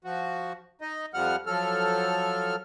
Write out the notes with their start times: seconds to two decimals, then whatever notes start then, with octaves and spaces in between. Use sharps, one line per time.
0.04 F3 F#4
0.81 D#4 D#5
1.14 F2 F3 G3 F#5 F6
1.46 F3 F#3 A4 F6